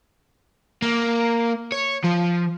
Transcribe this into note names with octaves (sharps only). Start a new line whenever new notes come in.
A#3
C#5
F3